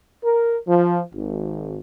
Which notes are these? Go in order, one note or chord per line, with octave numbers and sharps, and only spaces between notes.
A#4
F3
G#1